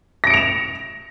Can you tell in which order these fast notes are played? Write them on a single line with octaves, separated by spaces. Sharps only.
A#6 D7 C#7 F7 E7